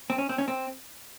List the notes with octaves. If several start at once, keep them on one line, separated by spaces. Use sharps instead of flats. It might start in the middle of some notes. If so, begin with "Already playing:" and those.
C4
C#4
C4
C#4
C4